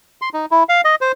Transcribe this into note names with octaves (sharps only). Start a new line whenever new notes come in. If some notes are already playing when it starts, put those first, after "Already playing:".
C6
D#4
E4
F5
D#5
C5